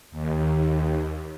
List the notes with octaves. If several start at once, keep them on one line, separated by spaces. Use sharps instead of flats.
D#2